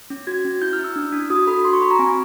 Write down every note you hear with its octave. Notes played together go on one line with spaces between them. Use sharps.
C#4
F#4 G#6
C#4
E4 G6
F6
E4
E6
D4
D4
F#4 D#6
A4 B5
F#4 C6
C#6
F#4 B5
A#5
C4 G#5